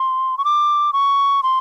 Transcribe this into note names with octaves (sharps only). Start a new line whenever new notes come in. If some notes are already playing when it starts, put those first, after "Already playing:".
Already playing: C6
C#6
D6
C#6
C6